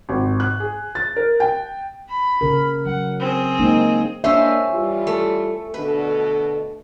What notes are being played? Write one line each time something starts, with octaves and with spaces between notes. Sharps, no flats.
G#1
F#6
G#4
A6
A#4
G5
B5
C#3 A#4
F#3 F#5
C4 G#4
G#3 A#3 D#4
G#3 A#3 C#4 D4 C5 E5
E3 G3 F4
A3
B2 D3 A4 B4